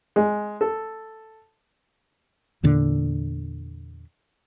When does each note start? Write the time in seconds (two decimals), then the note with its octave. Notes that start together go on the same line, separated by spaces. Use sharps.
0.16 G#3
0.61 A4
2.63 E2 A#2 D3